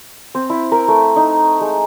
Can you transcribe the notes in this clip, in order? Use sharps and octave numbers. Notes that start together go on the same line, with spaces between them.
C4
E4
A#4
A3
D#4
G#3